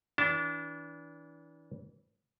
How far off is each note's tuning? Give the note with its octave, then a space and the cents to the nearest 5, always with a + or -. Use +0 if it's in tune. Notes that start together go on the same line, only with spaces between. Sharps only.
E3 -25 D4 -30 A5 +0